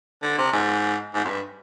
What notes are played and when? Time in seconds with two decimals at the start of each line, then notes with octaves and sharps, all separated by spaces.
0.22 D3
0.38 C3
0.52 G#2
1.14 G#2
1.25 F2
1.29 G2